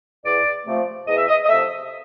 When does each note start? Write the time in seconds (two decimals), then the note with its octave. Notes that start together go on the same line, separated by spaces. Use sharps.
0.25 E2 D5
0.66 C3 F3 A3
1.08 E2 D#5
1.17 E5
1.27 D#5
1.44 D#5
1.49 C3 F3 A3 E5